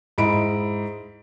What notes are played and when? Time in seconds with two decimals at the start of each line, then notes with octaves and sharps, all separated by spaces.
0.18 G#2 E4 D#5 B5 D7